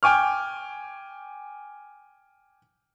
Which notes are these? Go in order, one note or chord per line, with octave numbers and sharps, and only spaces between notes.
G5 G#5 D6 F6